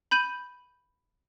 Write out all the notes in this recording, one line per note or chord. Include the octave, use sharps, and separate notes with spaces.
B5 G6 D#7 F#7